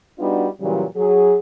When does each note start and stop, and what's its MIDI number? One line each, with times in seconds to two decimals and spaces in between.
0.19 0.47 55
0.19 0.47 59
0.19 0.47 62
0.19 0.47 63
0.19 0.47 65
0.19 0.47 66
0.61 0.84 46
0.61 0.84 49
0.61 0.84 52
0.61 0.84 54
0.61 0.84 55
0.96 1.36 54
0.96 1.36 68